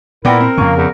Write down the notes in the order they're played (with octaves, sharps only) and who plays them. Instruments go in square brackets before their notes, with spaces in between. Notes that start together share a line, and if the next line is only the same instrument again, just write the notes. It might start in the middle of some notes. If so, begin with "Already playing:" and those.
[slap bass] A#2 [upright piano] B3 D5 G5 [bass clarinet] E4 [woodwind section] A#4
[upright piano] C4
[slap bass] F2 C#3 [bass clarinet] A#3 [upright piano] F5 C#6
[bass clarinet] E2